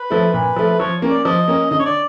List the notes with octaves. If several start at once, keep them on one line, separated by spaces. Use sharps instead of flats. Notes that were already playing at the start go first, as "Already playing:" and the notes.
Already playing: B4
F3 A3
A#2 B4
F3 A3
F3 C#5
A#3 C#4
D5
F3 D#5
A#3 C#4
D3 D#5
C#5
D5